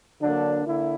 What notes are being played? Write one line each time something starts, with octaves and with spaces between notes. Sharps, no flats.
D3 F#3 A#3 D4
D3 A#3 E4